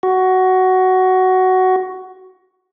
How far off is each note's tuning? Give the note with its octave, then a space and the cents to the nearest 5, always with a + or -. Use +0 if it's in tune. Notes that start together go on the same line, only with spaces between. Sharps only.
F#4 +10